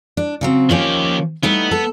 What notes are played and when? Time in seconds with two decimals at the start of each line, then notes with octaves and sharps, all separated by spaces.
0.17 D4
0.41 C#3 F#3 C4
0.70 D#3 F3 A#3 C#4 G4
1.43 G3 A3 B3 D#4
1.71 A4